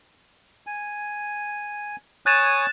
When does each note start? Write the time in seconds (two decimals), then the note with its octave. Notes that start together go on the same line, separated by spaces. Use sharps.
0.67 G#5
2.26 C#5 G#5 D#6 F#6 A6 E7